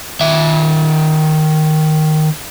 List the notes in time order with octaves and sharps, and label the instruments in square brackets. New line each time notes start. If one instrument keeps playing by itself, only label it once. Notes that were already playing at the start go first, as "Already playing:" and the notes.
[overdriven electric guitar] D#3 E5